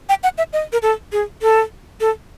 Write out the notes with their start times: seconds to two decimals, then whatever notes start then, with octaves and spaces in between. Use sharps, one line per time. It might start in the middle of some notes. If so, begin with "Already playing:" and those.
0.09 G5
0.23 F#5
0.38 E5
0.53 D#5
0.72 A#4
0.82 A4
1.12 G#4
1.42 A4
2.01 A4